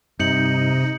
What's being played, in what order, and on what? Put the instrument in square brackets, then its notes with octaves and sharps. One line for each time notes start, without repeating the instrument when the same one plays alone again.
[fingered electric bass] G2 [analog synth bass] C3 [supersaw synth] D#4 [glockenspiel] G6 C#7 F#7